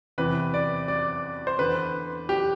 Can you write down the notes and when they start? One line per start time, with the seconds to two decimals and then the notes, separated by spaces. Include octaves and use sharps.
0.18 E2 C3 E3 B4
0.54 D5
0.88 D5
1.47 C5
1.59 E2 D3 B4
2.29 G4